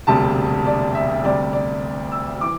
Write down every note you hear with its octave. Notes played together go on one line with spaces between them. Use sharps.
E1 D2 C3 G3 A5
D5
E5
D2 C3 G3 D5
D5
E6
E3 D6